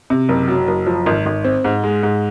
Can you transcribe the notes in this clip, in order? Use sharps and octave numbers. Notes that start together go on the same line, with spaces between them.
C3
F#1
F#3
F#1
F3
G#1
G#1
C4
G#2
G#3
G#2